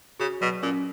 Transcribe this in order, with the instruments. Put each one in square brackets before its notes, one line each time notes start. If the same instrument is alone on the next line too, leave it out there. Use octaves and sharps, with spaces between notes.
[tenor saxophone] C#3 [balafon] F#4
[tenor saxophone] B2 [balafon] F#3
[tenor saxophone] A#2 [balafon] C#4